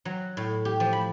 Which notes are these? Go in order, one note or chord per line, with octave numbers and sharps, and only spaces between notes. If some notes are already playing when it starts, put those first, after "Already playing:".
F#3
A2
G4
F3
B5